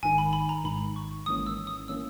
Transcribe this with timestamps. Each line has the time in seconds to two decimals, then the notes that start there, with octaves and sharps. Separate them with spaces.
0.03 G#1 G#2 D#3 G#5
0.18 B5
0.33 B5
0.49 A#5
0.64 G#1 G#2 D#3 B5
0.96 C#6
1.26 G#1 G#2 E3 A#3 C#4 D#6
1.47 E6
1.67 D#6
1.88 E3 A#3 C#4 E6